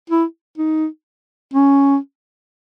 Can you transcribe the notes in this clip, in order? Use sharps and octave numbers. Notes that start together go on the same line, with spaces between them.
E4
D#4
C#4